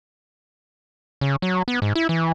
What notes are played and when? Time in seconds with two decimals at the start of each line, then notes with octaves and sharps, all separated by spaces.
1.21 C#3
1.42 F#3
1.68 B3
1.82 G#2
1.95 E4
2.09 E3